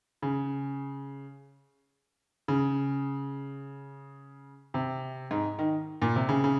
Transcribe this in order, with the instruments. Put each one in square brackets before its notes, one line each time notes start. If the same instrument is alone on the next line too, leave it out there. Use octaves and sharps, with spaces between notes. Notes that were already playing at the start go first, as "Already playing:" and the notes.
[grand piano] C#3
C#3
C3
G#2
D#3
A#2
C3
C#3
C#3